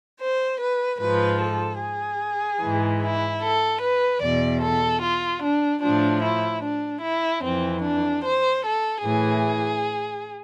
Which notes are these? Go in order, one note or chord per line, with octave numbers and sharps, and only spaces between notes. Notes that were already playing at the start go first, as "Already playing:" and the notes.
C5
B4
G#2 F3 B4
A4
G#4
G#2 E3
E4
A4
B4
E2 B2 D5
A4
F4
D4
A2 F3 D4
E4
D4
E4
F2 E3 C4
D4
C5
A4
A2 E3 G#4